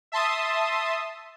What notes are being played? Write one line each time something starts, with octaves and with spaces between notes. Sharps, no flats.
E5 A5 C6 D#6